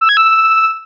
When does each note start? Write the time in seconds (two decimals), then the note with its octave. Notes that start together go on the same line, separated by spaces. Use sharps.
0.01 E6
0.09 G#6
0.17 E6